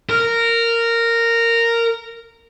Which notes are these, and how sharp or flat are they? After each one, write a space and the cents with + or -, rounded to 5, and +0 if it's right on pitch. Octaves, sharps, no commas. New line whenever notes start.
A#4 -10